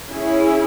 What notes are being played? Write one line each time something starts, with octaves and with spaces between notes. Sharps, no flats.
C#4 E4 G#4